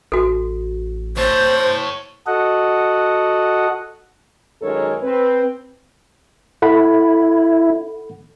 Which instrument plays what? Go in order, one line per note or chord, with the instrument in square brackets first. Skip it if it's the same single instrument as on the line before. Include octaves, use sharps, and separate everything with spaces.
[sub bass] A1 [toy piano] F#4 A4
[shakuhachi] C5 [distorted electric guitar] C#5 A5
[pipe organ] F#4 A4 D#5 F#5
[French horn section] F#2 D#3 G#3 A4 A#4 C#5
C4 B4
[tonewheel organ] E4 [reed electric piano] A4 F#5 B5